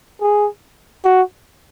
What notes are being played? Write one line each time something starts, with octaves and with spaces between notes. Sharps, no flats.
G#4
F#4